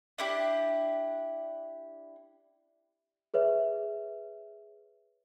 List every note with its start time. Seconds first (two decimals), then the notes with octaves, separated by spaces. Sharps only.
0.18 D4 E4 G4
3.34 G#4 B4 C#5 E5